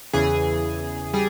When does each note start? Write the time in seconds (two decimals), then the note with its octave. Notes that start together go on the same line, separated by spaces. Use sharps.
0.13 E2 C#3 E3 G#4
1.14 G3 G#4